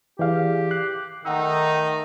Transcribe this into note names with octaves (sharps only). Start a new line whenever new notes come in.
E3 G4 G#4 D5 F5
F#6 C7
D#3 A3 D#4 F#5 G5 E6